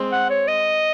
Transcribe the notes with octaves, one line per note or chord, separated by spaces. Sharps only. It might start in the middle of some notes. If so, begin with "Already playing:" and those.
Already playing: G#3 C4
F#5
C#5
D#5